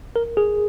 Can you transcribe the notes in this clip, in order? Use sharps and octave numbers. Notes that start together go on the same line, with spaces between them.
A#4
G#4